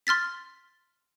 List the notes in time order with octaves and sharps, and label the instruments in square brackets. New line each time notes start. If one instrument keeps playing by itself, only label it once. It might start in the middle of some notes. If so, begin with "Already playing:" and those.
[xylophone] C6 F6 A6 B6